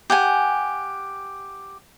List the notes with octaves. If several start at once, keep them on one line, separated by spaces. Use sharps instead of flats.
G4 F#5 G#5